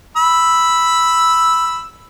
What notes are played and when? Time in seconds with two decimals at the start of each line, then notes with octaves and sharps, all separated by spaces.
0.17 B5 E6